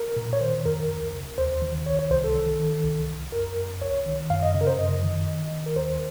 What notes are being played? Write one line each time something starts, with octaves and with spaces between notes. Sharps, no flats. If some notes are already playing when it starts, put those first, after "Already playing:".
Already playing: A#4
A#2
C#5
D#3 C5
F2 A#4
C#2
C#3
D#2 C5
D#3
C2 C#5
C#5
C2 C5
A4
D#3
D#3
C2
C2
F#2 A#4
F#2
C2 C#5
D#3
F#2 F5
D#5
C#3
A#4
C5
F#2 D#5
D#3
D#3
D#3
A#4
D#2 C5